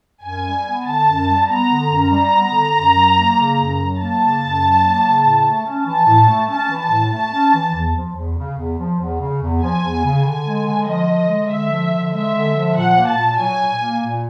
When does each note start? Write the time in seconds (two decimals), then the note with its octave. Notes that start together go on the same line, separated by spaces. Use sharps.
0.22 F#2 G#5
0.44 G3
0.65 B3
0.85 D3 A5
1.06 F#2
1.27 G3
1.48 B3 A#5
1.69 D3
1.90 F#2
2.11 G3 A#5
2.32 B3
2.52 D3
2.73 F#2
2.94 F#3
3.16 A#3
3.37 C#3
3.57 F#2
3.78 F#3
3.99 A#3 A5
4.20 C#3
4.41 F#2
4.62 F#3
4.82 A#3
5.03 C#3
5.24 A2
5.45 A3
5.66 C#4
5.86 E3 A5
6.07 A2
6.29 A3
6.50 C#4 A5
6.70 E3
6.80 A5
6.91 A2
7.12 A3 A5
7.33 C#4
7.54 E3
7.75 E2
7.96 F3
8.16 E2
8.38 C#3
8.58 E2
8.79 F3
9.00 E2
9.21 C#3
9.43 E2
9.62 F3 G#5
9.84 E2
10.05 C#3
10.25 D3 G#5
10.46 G#3
10.67 D3
10.88 F3 D#5
11.09 D3
11.29 G#3
11.50 D3 E5
11.72 F3
11.93 D3
12.13 G#3 E5
12.34 D3
12.56 F3
12.76 A#2 F#5
12.97 A#3
13.07 A5
13.18 A#2
13.38 F#3 G#5
13.60 A#2
13.81 A#3
14.02 A#2